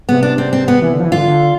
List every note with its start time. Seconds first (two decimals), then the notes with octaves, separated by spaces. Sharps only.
0.09 C3 B3
0.23 D4
0.38 C4
0.53 C4
0.68 B3
0.82 E3
0.93 D3
1.00 F3
1.05 E3
1.12 D3 F4
1.27 D3